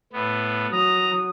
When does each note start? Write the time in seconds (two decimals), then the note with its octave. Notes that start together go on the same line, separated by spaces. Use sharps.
0.13 A2 B3
0.72 F#3 A#5 D#6